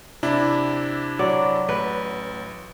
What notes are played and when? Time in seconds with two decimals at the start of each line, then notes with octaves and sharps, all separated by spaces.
0.23 C3 D4 E4
1.19 F#3 D5
1.69 A1 B4